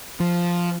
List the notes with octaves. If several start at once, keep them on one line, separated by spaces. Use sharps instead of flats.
F3